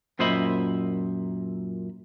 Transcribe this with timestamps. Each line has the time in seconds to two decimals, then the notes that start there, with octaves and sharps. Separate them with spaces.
0.19 F#2 A#2 C5 D#5 E5 B5